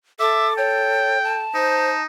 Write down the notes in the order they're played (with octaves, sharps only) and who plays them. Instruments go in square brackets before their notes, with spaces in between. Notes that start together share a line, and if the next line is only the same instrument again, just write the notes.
[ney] A4 [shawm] E5 [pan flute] D6
[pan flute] C#5 [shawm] G5
[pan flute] A5
[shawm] D#4 [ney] C5